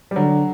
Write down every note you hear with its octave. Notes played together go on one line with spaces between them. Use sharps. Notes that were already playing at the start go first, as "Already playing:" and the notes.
G3
D3 F#3